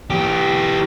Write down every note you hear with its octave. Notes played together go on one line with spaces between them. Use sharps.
E3 G4